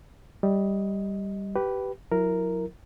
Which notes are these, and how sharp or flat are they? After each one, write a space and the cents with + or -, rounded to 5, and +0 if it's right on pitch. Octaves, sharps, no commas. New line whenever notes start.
G3 +0 D#5 +15
G4 -20 B4 +0
F#3 -30 E4 +0 A#4 +0